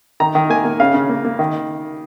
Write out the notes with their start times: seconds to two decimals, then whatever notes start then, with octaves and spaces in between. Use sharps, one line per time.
0.20 D#3 A#5
0.35 D#3
0.50 A#3 G#5
0.65 A#3
0.80 C#3 F5
0.94 C#3
1.09 A#3
1.25 A#3
1.39 D#3